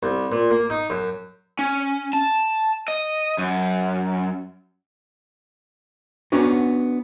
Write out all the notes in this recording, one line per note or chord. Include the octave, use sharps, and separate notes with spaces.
C2
A#2
A#3
D#4
F#2
C#4
A5
D#5
F#2
B3 C#4 D4 F#4